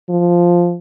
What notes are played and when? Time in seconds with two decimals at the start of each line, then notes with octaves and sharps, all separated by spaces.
0.10 F3